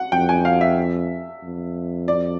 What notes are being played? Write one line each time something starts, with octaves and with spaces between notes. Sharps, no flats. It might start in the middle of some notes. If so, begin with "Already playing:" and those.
Already playing: F#5
F2 G5
G#5
F5
E5
F2
D5